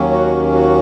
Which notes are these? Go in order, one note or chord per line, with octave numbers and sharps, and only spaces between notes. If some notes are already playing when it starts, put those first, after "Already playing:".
Already playing: D#2 D#3 F#3 A#3 C#4
F#4
F#4